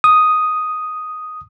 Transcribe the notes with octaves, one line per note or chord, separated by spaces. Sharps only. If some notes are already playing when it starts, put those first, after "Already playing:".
D#6